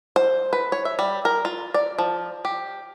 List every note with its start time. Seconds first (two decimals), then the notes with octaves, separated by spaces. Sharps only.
0.16 C5
0.53 B4
0.72 C#5
0.85 E5
0.99 G3
1.25 A#4
1.45 F4
1.74 D5
1.99 F3
2.45 G4